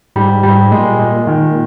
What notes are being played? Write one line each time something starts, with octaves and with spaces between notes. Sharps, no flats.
G#2 G3
G3
A#2 G#3
G#3
D#3